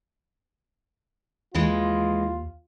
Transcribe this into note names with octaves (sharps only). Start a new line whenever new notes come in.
D#2 E3 G#3 F4